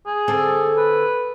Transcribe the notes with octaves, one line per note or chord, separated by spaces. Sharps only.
G#4
D3 C4 A4
B4